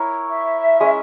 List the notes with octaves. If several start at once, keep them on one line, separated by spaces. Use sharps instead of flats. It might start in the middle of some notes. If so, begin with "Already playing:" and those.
Already playing: E4 A#4 C#5
E5
G#3 C#4 G#4